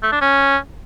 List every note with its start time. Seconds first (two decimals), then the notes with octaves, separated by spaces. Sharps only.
0.03 A3
0.12 D4
0.21 C#4